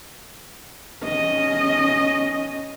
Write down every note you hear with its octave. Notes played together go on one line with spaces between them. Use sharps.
C#4 D#5